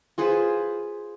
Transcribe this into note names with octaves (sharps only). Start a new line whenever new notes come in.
F4 G#4 B4 C5